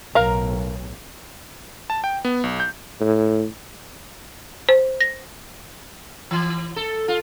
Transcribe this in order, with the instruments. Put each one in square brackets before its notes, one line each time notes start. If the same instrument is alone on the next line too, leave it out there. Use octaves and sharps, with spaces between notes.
[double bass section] B1 A2 [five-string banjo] A#4 F5 A#5
[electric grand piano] A5
G5
B3
B1
G6
[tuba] A2
[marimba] C5
A#6
[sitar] E3
A4
F4